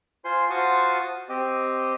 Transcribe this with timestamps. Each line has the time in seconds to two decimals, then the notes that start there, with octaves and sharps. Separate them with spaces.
0.25 F4 C5 G#5 C6
0.50 F4 F#4 C5 A5 C#6 D#6
1.29 C4 G4 D#5